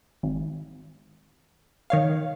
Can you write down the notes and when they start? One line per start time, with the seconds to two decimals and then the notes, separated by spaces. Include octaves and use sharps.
0.23 G#1
1.90 D#3 C#5 F5